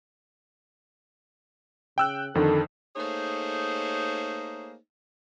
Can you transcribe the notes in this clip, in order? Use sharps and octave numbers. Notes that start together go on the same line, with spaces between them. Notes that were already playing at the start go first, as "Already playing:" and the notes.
C#3 G5 E6 F#6
F2 D3 D#3 A4
A3 A#3 D#4 G#4 C5 C#5